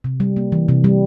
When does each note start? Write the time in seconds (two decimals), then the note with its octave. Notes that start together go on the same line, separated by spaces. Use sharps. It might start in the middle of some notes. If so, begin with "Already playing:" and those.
0.04 C3
0.20 G3
0.37 A#3
0.52 E3
0.69 C3
0.84 G3